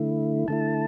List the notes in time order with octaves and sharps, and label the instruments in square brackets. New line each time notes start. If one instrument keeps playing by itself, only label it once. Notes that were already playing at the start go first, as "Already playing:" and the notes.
Already playing: [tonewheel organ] D3 A3 E4
D3 A3 E4 A5